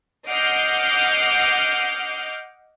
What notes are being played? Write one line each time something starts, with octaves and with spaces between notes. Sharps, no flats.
D#5 F#5 D6 F6 G6 C7